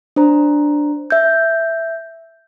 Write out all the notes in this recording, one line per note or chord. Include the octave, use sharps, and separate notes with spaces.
D4 C5 A#5
E5 G6